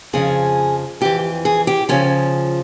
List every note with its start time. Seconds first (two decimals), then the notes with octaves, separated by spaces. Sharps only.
0.13 F2 C#3 F3 G#4
1.01 F2 E3 G4
1.45 G#4
1.67 G4
1.89 C#3 F3 C#4